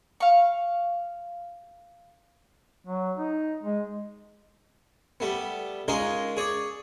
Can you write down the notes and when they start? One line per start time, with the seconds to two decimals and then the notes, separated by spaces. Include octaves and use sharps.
0.20 F5 C#6
2.85 F#3
3.18 D#4
3.63 G#3
5.20 G3 A3 B3
5.88 G#3 C#4 D#4 F4 A#4 D#5
6.37 G#4 C#5 D5